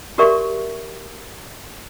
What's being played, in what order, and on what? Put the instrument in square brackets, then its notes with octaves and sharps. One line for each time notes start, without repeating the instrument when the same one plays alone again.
[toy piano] F#4 G4 A#4 D5 E5 C#6